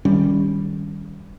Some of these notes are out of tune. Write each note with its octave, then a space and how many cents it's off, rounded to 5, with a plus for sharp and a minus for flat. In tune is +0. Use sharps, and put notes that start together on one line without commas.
D#3 +0 G3 +0 C#4 +20